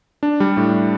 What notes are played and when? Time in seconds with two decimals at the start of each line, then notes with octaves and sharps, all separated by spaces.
0.23 D4
0.40 G3
0.57 A2